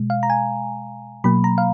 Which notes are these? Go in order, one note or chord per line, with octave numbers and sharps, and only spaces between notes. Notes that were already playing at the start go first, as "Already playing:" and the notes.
Already playing: B2 G#3
F5
A#5
G#5
B2 F#3 A#3 B5
A#5
F5